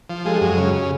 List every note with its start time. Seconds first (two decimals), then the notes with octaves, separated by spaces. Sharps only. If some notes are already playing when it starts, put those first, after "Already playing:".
0.10 F3
0.25 G#3 G4 A4
0.35 G4 A4
0.41 F#2
0.47 F#4 G#4
0.58 C#3